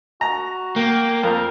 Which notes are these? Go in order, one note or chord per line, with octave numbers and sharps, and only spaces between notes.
F#4 A#5
A#3 G5
F2 A#4